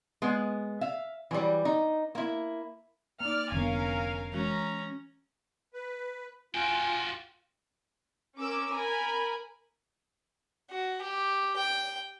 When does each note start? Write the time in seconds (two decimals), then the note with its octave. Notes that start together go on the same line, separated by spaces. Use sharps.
0.22 G#3 B3
0.81 E5 F5
1.31 E3 F#3 G3
1.65 D#4
2.15 A#3 E4
3.20 A#3 D#4 D5 F6
3.52 F1 D3 G3 B3 C#4 A#4 F5 G#5
4.33 E3 G#3 C#4 F#4 A#5
5.73 B4
6.55 F4 F#4 G5 G#5
8.37 C#4 A#4 D6 E6
8.73 A#4 G#5 A#5 B5
10.70 F#4
11.02 G4
11.56 G5